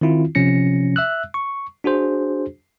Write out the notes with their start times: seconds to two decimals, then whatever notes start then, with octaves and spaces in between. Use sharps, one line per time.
0.01 D#3 C4 E4 F4
0.35 C3 F3 C#4 A#6 C#7
0.96 E5 E6 F#6
1.34 C#6
1.84 D4 F#4 G#4 C5